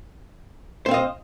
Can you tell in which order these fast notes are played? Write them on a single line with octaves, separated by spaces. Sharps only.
C5 C4 F5 D#5